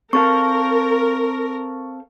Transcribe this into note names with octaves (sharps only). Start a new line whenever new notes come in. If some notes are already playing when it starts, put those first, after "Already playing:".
C4 A4 A#4 F5 C#6